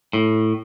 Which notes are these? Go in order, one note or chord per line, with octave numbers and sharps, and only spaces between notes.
A2